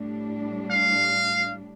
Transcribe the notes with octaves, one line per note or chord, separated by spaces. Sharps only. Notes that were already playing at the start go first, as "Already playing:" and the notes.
Already playing: A2 G3 D4
F5